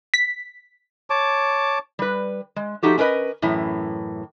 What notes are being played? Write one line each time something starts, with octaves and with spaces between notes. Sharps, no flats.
B6
C#5 A5 D6
G3 B4
G#3
F3 A3 D#4 F#4 G4 A4
C#4 D4 A#4 B4 D#5
F#2 A2 E3 C#4